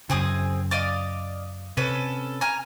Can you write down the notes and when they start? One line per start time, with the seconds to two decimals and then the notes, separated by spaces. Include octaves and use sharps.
0.10 F#2 C#3 C4 G#4 D#6
0.71 D5 D#5 F5
1.77 C3 C#4 A4 B4
2.41 G#5 A#5 F6